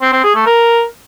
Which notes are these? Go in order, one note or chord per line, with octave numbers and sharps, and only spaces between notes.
C4
C4
G#4
A3
A#4